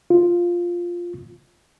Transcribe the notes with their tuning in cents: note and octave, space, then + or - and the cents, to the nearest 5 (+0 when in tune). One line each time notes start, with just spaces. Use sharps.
F4 +0